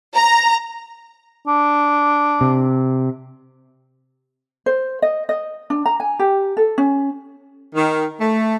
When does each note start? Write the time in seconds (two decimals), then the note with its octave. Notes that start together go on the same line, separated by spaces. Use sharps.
0.16 A#5
1.47 D4
2.41 C3
4.66 C5
5.02 D#5
5.29 D#5
5.70 D4
5.86 A#5
6.00 G#5
6.19 G4
6.57 A4
6.78 C#4
7.75 D#3
8.19 A3